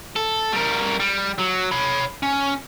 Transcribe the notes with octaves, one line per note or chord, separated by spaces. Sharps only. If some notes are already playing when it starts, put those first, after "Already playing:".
A4
G3 A#4
G3
F#3
C#5 B5
C#4